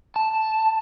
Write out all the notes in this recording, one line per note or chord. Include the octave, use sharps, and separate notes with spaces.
A5